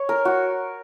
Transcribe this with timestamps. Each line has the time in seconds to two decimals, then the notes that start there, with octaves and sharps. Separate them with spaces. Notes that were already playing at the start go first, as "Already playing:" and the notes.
Already playing: C#5
0.09 A#4
0.25 F#4